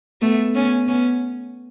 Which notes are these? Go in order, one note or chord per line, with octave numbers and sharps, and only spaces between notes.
A3 B3
B3 C#4
B3 C#4